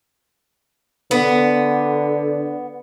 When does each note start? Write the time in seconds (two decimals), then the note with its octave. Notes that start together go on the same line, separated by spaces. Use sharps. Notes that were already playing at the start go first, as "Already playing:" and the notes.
1.11 D3 B3